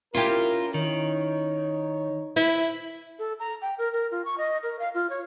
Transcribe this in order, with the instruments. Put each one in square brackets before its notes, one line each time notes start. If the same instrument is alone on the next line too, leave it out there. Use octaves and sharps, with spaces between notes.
[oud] C#4 E4 G4 [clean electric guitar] F4 [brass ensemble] A#4
[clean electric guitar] D#3 [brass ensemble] D#4 C#5
[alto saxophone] E4 [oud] B4
[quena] A4
A#5
G5
A#4
A#4
F4
C#6
D#5
A#4
F5
F4
C#5